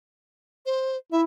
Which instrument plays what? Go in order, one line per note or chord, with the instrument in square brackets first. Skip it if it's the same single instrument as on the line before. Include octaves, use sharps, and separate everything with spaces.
[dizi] C5
[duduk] E4 [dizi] E5